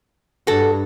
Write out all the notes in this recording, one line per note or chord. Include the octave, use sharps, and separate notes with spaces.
G2 F#4 A4